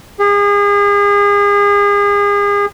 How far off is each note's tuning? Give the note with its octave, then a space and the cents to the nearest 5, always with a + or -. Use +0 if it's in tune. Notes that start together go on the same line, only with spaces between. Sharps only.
G#4 -35